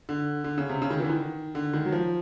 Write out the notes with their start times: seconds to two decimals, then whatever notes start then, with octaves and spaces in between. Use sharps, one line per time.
0.09 D3
0.44 D3
0.58 C#3
0.69 C3
0.82 C#3
0.90 D#3
1.00 D3 E3
1.10 D#3
1.55 D3
1.74 D#3
1.85 F#3
1.92 F3